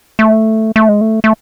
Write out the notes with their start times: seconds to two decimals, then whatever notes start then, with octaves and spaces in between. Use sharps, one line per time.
0.19 A3
0.76 A3
0.89 G#3
1.01 A3
1.24 A3